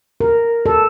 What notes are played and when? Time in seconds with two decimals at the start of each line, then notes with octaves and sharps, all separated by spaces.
0.20 A#4
0.66 A4